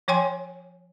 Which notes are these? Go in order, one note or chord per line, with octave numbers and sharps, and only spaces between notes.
F3 C#5 G5 G#5 C6